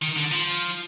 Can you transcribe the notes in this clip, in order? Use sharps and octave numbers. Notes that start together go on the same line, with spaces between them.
D#3
D3
F3